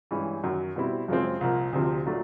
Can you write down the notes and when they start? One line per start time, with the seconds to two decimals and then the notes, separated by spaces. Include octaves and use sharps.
0.11 G2 E3 G#3 C#4
0.44 F#2 D#3 F#3
0.76 B2 G3 C4 E4
1.08 F#2 C#3 F3 G#3 C4
1.41 C2 A#2 F3 A#3
1.73 D2 C3 F3
2.06 A#2 F#3 A3 D4